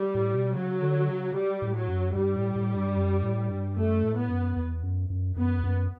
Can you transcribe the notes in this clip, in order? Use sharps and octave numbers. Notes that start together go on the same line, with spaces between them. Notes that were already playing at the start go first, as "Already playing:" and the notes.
Already playing: G3
A2
B2
C#3 F#3
D3
C#3
G3
A2
F#3
F#2
G2 G3
A2
A2
G2
F#2
A2
G2
F#2 A3
A2
B3
F#2
E2
F#2
F#2
F#2 B3
E2
F#2